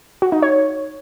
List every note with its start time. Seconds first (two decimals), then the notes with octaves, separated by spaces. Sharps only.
0.22 F#4
0.32 D#4
0.42 C#5